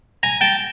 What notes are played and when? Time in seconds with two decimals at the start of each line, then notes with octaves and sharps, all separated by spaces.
0.23 G#5 A#5
0.41 G5 A5